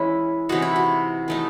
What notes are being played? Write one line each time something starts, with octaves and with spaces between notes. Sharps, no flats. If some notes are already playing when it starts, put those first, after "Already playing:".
Already playing: E3 G#3 C#4 E4
C3 E3 G#3 D#4 F#4
E4
F#4
E3 A3 D#4